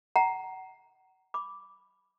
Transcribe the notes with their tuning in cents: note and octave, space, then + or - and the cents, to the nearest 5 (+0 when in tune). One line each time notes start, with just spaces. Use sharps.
F#5 +30 A#5 +0
B5 +0 D6 -5